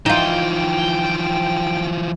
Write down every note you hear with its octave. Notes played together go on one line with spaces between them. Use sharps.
E3 F3 D#4 F4 G5